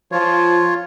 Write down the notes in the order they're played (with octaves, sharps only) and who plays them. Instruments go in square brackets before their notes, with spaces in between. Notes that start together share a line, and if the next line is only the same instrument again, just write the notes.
[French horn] F3 [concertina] F4 C#5